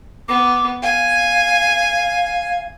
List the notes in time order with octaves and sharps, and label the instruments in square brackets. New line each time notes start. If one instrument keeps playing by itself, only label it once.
[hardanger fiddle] B3 [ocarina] D6
[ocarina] F5 [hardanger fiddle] G#5